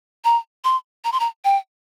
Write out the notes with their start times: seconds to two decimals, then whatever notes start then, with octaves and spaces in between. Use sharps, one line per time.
0.25 A#5
0.64 C6
1.05 A#5
1.12 C6
1.20 A#5
1.45 G5